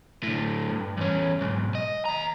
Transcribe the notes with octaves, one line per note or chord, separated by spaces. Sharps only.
A2 D3
G2
E2 C#4
B1 G#2
D#5
D#2 A#5